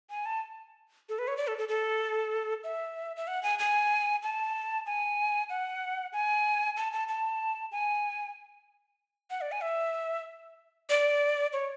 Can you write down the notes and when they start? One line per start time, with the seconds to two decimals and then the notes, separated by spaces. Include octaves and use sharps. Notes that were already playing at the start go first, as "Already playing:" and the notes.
0.10 G#5
0.26 A5
1.09 A4
1.19 B4
1.28 C#5
1.37 D5
1.47 A4
1.58 A4
1.68 A4
2.64 E5
3.16 E5
3.28 F#5
3.43 G#5
3.59 G#5
4.23 A5
4.86 G#5
5.50 F#5
6.13 G#5
6.77 A5
6.93 A5
7.08 A5
7.72 G#5
9.30 F#5
9.41 D5
9.52 G#5
9.62 E5
10.90 D5
11.53 C#5